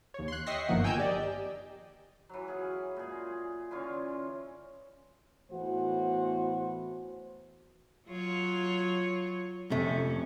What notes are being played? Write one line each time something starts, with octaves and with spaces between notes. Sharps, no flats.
D#2 C#5
C6 F#6
D#5 E5 G5 C#6 A#6 C7
G1 D#3 F3 A#3 F#5
G5 G#5 A#5 E6 G6
G4 D5 D#5
E3 F#3
G#4 F5
A#2 G#4
D3 E3 C#4 F4
A2 E3 B3 F#4 C5
F#3 F4 C#5
F2 C3 A3 C#4